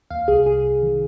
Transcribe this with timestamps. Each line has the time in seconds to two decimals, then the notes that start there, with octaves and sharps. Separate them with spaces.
0.11 D#2 F5
0.28 C2 G#4
0.46 C2 G#4
0.65 C2
0.83 D#3